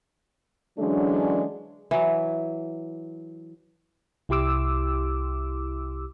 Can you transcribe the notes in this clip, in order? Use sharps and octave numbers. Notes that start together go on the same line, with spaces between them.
D3 E3 F#3 G#3 C#4 D4
E3 F#3
C2 E4 G4 C6 D6 E6